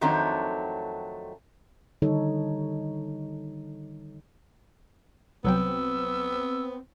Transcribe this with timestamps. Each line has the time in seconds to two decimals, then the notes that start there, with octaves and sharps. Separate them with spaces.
0.01 F2 D#3 F#3 A3 C4 D4
2.02 D3 D#3 G3 D#4 A4 C#5
5.44 C2 F#3 B3 C4 G5 E6